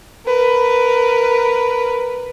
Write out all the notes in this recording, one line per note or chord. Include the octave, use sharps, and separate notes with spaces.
A#4 B4